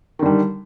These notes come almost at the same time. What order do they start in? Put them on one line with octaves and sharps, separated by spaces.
D#3 D3 G3